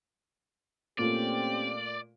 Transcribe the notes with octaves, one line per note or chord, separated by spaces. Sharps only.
A#2 A3 C4 C#4 G4 D5